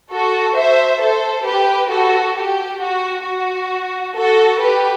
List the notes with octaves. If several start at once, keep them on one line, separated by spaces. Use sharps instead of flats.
F#4 A4
C5 E5
A4 C5
G4 B4
F#4 A4
G4
F#4
F#4
F#4 A4
G4 B4